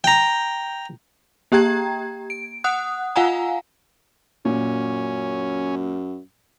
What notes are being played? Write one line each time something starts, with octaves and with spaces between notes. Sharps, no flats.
G5 A#5
A#3 G4 G5 A#5 G#6
D7
F#5 D#6 F#6
F4 F5 F#5 G#5 A#5
F#2 A#2 C#4